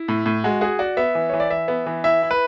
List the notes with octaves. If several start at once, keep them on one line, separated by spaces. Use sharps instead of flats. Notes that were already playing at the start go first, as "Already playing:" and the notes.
Already playing: E4
A2
A2
G#3 F#4
F#4 G#4
F#4 D5
B3 E5
E3
E3 C#5
D5
E3 E5
B3
E3
E4 E5
E4
B4